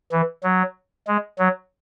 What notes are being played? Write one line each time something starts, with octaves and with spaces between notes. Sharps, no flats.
E3
F#3
G#3
F#3